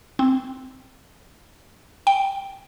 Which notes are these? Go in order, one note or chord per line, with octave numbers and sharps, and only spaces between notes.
C4
G5